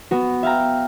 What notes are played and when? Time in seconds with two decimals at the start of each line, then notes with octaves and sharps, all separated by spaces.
0.11 B3 F#4
0.43 E5 F5 G5 A#5